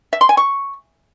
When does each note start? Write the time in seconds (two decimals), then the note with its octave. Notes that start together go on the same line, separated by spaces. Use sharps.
0.13 E5
0.21 C6
0.29 G#5
0.37 C#6